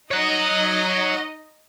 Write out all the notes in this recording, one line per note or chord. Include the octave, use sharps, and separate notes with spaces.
D#4 C#5 D#5 F#5